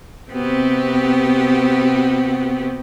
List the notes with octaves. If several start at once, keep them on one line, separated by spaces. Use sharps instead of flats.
C3 B3 C4 F#4 G4